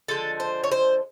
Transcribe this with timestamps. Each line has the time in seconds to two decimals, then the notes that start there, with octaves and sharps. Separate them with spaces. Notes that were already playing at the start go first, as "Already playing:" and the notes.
0.08 D3 F3 G#3 A4
0.40 C5
0.64 C#5
0.71 C5